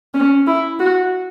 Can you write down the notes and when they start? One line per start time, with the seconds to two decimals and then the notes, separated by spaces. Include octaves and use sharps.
0.14 C#4
0.47 E4
0.80 F#4